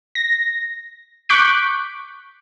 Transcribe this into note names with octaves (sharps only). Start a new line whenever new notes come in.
A#6
C#6 D6 F#6 G6 B6 D7